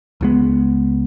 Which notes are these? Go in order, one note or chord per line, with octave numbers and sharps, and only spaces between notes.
C#2 C#3 G#3 B3